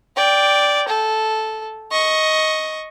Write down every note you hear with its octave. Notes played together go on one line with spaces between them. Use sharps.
D5 G5
A4
D#5 C#6